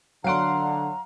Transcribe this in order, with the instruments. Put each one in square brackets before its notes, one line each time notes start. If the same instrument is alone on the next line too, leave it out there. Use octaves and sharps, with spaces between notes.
[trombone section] D3 [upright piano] F#3 D7 [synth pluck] F5 F#5 C6 [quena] A#5